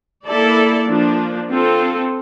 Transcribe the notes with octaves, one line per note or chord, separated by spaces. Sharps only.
A#3 E4 A4 D5
F3 A#3 D4
C4 F4 A4